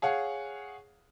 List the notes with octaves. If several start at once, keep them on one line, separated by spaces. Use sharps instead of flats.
G#4 C#5 F5 F#5